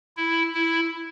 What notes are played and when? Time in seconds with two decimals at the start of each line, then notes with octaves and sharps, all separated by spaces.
0.17 E4
0.54 E4